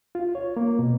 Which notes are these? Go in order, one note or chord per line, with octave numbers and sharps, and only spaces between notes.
F4
C#5
A#3
B2